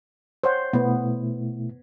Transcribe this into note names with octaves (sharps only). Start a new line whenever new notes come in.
C5 C#5 F#5
B2 A3 B3 E4